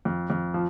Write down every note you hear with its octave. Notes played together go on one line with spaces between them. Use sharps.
F2
F2
F3